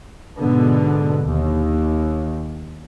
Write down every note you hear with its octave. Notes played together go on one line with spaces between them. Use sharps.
G#2 B2 D3 B3
D#2